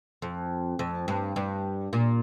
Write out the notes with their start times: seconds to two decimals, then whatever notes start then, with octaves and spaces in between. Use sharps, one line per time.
0.22 F2
0.79 F2
1.08 G2
1.36 G2
1.93 A#2